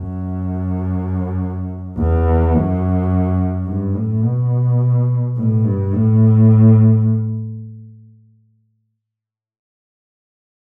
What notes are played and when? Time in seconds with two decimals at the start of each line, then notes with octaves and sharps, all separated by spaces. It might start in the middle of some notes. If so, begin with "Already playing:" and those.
Already playing: F#2
1.98 E2
2.54 F#2
3.67 G2
3.95 A2
4.24 B2
5.36 A2
5.64 G2
5.93 A2